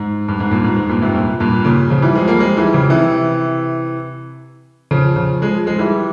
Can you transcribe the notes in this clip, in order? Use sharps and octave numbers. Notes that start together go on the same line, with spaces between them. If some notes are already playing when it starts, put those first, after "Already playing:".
Already playing: G#2
G2
G#2
G2 A#2
G#2
G#2
G2 A#2
G#2 C3
G2 A#2
G2 A#2
A#2 C#3
C#3 F3
E3 G3
F3 G#3
G3 A#3
F3 G#3
E3 G3
C#3 F3
C3 E3
C#3 F3
C#3 F3
F3 G#3
F3 G#3
E3 G3